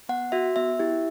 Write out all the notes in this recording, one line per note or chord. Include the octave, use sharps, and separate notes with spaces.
B3 F#5
F#4 E5
B3 E5
E4 G4